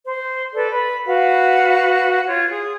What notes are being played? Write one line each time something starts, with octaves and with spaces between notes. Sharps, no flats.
C5
A4 B4 D5
B4 B5
F#4 B4 F5
F4 C#5
G#4